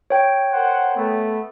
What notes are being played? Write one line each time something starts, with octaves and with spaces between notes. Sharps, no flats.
C#5 G5
A#4 C5 F#5
A3 B3